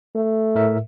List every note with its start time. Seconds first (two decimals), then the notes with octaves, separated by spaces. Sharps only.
0.15 A3
0.55 A2 A#4 E5